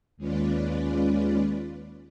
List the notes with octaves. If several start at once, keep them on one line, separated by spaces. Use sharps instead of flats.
D#2 G#3 C#4 F4 B4 D5